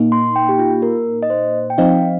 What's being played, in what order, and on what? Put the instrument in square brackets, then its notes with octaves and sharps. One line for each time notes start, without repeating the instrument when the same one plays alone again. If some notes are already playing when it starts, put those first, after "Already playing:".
Already playing: [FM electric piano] A#2 A#3 D#4
[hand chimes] C6
G5
G4
F4
A#4
D#5
C5
G5
[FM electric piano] F3 C4 D#4 [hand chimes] F5